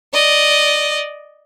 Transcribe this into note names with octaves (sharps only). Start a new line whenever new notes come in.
D5 D#5